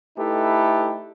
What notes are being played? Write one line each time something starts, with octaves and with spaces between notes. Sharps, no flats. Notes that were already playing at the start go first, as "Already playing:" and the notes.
A3 D#4 E4 G4 A4 B4